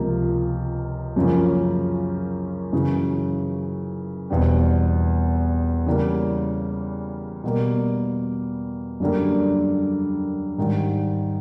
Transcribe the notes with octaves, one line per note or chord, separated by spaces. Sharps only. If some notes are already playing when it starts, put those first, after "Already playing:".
Already playing: C#2 C3 F3 A#3
F#2 C#3 F3 A#3 C#4
F#2 C#3 E3
E2 B2 G3 C4
C#3 E3 G3 A#3
B2 G3 A#3
F#2 D3 G3 A#3
G#2 D#3 G3